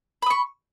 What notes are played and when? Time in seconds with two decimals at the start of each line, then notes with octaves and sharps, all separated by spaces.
0.22 B5
0.26 D#6
0.30 C#6